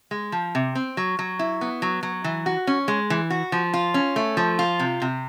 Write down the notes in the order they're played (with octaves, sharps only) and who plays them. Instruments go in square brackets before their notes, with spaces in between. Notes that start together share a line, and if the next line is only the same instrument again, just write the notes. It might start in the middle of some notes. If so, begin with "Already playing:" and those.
[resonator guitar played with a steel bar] G#3
F3
C3
C4
F#3
F#3
E4
B3
F#3
F#3
E3
F#4
C#4
G#3
E3
F#4
F3
F4
C#4
A3
F3
F4
C3
C3